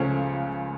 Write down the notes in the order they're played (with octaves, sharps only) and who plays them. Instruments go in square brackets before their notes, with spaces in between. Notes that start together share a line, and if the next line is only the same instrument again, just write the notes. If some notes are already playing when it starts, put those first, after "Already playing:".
Already playing: [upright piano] C#2 C#3 F3 A3 C#4